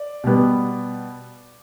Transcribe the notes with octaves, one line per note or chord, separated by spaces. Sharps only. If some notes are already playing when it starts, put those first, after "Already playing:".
Already playing: D5
B2 G3 B3